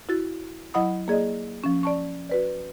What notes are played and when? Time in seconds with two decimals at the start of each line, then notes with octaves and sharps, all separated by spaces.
0.09 E4 F#4 A6
0.74 F#3 E4 D#5 F#5 B5 D#6
1.08 A#3 G#4 D5 D#5
1.64 F3 C#4
1.83 D5 A5 C#6
2.29 F#4 B4 D5